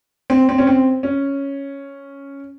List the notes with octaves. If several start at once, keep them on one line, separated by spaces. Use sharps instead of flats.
C4
C4
C#4
C4
C#4